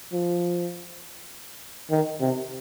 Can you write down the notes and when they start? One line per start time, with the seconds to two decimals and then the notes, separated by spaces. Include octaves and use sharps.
0.13 F3
1.91 D#3
2.21 C3